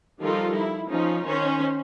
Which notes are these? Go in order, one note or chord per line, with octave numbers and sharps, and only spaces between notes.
D#3 F3 G3 F4 A4 A#4
E4
F3 C#4 D#4 F4
D#3 C#4 C5